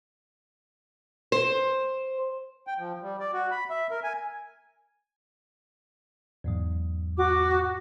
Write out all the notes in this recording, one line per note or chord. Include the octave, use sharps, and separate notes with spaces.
C5
G5
F3
G3
D5
F#4
B5
E5
A#4
G#5
E2 G#2 F#3
F#4 D6